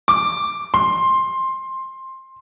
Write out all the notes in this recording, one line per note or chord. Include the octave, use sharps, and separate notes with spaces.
D6
C6